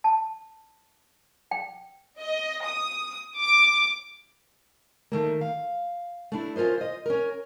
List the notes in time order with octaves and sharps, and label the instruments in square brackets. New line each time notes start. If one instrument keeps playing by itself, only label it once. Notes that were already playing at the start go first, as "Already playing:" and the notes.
[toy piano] A5
G5
[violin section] D#5
D#6
D6
[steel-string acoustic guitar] D#3 A3 A#3
F5
A3 D4 E4
C#4 F4 A#4 C5 D#5
C5 D#5
C#4 A#4